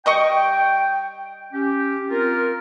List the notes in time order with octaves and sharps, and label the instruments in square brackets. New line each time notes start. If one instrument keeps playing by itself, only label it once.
[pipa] G3 D#5 C#6 [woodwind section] G5
[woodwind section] C#4 G4
C4 F4 A#4